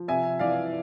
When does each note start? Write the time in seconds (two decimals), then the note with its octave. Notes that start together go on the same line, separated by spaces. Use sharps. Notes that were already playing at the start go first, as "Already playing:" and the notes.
Already playing: F3
0.08 C3 E5 G#5
0.39 E3 D5 F5